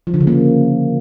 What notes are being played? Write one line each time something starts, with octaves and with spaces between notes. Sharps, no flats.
F3
D3
C#3
A#3